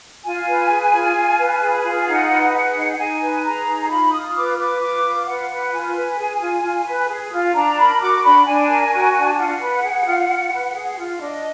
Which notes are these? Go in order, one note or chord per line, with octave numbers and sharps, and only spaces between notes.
F4 G#5
B4
G#4
F4
F4
B4
G#4
F4
D#4 F#5
B4
G#4 F#5
D#4
D#4 G#5
B4
G#4 A#5
D#4
F4 B5
F4 D#6
B4 D6
B4 D6
F4 D6
F4
B4 F#5
B4
F4 G#5
B4
G#4
F4
F4
B4
G#4
F4
D4 A#5
A#4 B5
F#4 D6
D4 B5
D4 G#5
A#4
F#4
D4
F4 F#5
B4
G#4
F4
F4
B4
G#4
F4
D4 D#5